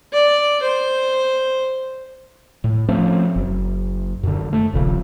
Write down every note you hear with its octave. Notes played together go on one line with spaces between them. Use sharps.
D5
C5
A2
F3 A3 C4 C#4
F#1
F#2 D3
A3
D#1 A#1 C#3